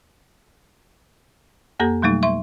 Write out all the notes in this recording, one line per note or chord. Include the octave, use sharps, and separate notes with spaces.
F2 A#3 G4 A4 A#5
B2 F#3 G3 A3 D#4
E5 C6 C#6